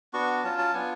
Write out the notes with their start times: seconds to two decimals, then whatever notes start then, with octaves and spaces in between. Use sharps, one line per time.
0.13 B3 D4 F#4 C#6
0.44 F#3 C#4 F4 A5
0.59 A5
0.74 B3 D4 F4 G#5